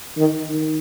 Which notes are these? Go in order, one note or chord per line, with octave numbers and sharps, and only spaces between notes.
D#3
D#3